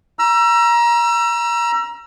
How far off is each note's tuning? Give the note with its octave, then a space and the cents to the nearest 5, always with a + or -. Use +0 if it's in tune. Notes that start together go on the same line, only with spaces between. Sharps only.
A#5 +25 E6 +35